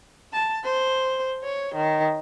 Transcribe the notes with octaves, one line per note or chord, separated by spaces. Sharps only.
A5
C5
C#5
D#3